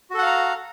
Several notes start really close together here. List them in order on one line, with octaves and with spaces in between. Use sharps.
F#4 A4 F#5 F5 A#5